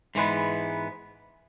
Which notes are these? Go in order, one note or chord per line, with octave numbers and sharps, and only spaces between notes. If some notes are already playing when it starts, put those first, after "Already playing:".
G#2 E3 G#3 B3